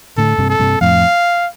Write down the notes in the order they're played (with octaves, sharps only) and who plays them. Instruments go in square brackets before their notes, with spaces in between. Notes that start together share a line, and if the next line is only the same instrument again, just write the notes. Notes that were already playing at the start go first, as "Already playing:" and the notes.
[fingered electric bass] A2 D3 [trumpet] A4
[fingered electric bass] G2 C3
[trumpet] A4
[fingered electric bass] G2 C3
[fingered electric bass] F2 A2 [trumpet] F5